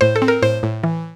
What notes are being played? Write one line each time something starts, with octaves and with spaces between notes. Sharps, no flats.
A2 C5
A4
C4
A#4
A2 C5
A2
E3